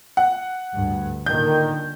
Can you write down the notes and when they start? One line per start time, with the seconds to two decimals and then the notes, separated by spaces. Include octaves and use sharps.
0.17 F#5
0.72 D2 G2
1.26 A#2 D3 D#3 G6